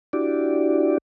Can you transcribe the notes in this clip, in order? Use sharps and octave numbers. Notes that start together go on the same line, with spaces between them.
D4 E4 F#4 G4 D5